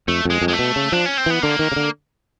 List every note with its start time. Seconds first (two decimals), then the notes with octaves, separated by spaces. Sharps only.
0.08 F2 A3
0.25 F2 G#3
0.42 F2
0.48 G#3
0.53 A3
0.59 B2
0.76 C#3
0.92 F3 D4
1.06 C#4
1.17 C4
1.26 E3 B3
1.42 D3 A#3
1.59 D#3
1.72 C#3
1.76 D3